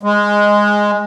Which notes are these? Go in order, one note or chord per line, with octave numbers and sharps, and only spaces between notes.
G#3